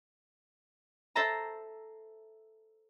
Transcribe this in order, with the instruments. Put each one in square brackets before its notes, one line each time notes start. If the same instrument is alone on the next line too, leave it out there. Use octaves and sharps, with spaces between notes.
[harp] A4 C5 E5 A5 A#5